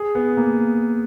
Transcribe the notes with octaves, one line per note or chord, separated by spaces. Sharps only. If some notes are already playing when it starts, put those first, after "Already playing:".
Already playing: G#4
B3
A#3